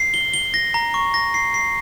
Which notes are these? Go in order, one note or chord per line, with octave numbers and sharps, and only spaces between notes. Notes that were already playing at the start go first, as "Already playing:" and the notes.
Already playing: C7
G7
G7
A#6
A#5
C#6
A#6
C7
C7